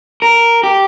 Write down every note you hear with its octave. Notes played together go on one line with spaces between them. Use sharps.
A#4
G4